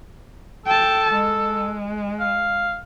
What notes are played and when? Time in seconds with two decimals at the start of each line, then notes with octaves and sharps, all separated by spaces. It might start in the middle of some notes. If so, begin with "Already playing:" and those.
0.66 A4 G5 A5
1.14 G#3
2.20 F5